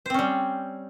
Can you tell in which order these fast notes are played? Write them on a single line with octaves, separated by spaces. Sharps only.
C5 C4 C#4 G3